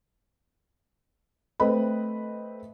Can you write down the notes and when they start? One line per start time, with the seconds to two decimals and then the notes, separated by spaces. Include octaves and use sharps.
1.60 A3 C4 B4 D#5 B5